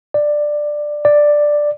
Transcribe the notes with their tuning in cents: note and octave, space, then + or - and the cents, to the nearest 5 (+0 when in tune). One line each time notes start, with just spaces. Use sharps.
D5 +10
D5 +5